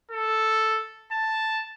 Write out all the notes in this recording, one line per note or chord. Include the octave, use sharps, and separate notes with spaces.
A4
A5